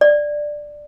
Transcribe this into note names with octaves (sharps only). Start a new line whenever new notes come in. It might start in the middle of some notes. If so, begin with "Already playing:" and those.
D5